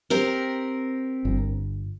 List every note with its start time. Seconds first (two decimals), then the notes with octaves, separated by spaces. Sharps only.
0.10 C4 G4 A#4
1.25 G1